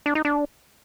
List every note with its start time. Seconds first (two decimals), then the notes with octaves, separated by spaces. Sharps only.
0.06 D4
0.15 D#4
0.25 D4